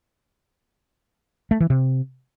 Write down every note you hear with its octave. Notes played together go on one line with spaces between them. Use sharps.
A3
E3
C3